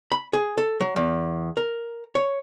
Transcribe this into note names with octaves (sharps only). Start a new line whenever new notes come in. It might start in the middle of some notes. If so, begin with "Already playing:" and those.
B5
G#4
A4
F#3
E2
A#4
C#5